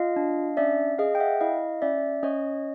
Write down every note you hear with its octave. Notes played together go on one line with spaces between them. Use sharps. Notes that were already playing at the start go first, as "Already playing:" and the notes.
Already playing: F4 D#5 F5
D4
C#4 D5 E5
G#4 D#5 F5
G5
E5 F#5
E4 D#5 F5
C#4 D5 E5
C#4 C#5 D#5